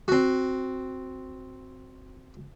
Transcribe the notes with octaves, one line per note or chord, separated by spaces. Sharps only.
C4 F#4